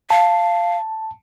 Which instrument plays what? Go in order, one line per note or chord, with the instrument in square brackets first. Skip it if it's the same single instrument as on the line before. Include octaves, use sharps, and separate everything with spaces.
[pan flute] F5 [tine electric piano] A5